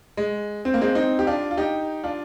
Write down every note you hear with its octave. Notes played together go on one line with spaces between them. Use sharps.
G#3
C4
A#3
G#3 C4
C4 D#4
G4
D4 F4
F4
D#4 G4
D4 F4